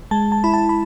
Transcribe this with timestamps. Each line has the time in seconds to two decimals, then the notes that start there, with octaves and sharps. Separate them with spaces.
0.11 G#3 A5
0.32 A5
0.44 E4 B5
0.54 A5
0.69 B5